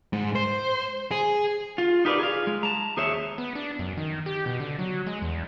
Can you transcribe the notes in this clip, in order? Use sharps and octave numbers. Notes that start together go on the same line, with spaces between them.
G#2
C5
G#4
F4
D#4 G4 A#4 B4 C#5 D5
G#4 F5
G#3
A5 A#5
D#2 G#4 C5 C#5 E5
B3
D4
F#2
D#3
G4
B2
D3
F#3
G#3
E2